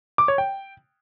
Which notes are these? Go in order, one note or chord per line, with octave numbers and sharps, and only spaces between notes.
D6
C#5
G5